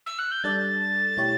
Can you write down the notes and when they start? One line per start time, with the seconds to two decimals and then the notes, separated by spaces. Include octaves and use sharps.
0.06 E6
0.19 F#6
0.31 G6
0.44 G3 D4 A4 D5 A6
1.17 B2 A3 E4 G4 C#5